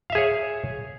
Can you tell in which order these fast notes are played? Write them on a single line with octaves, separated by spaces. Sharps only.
F5 E5 G#4 C#5